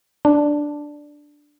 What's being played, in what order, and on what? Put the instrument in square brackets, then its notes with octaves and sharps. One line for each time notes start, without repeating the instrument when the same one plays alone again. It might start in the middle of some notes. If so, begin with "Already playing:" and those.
[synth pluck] D4